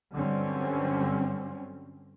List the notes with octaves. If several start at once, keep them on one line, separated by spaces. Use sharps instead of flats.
G2 D3 F#3 G3 C4 C#4